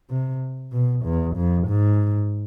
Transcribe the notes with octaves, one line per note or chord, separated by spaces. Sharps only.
C3
B2
E2
F2
G#2